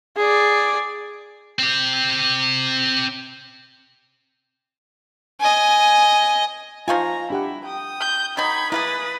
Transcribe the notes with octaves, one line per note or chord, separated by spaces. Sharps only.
G#4 D5
C4 G4
D#5 G#5
F3 D#4 F4 F5 G#5 A#5 C#6
D4 E4 G4 F#5
G5 D#6
G6
D#3 F#3 D#4 B5 G6 G#6
A#3 E4 F4 G#4 B4 D#6 A6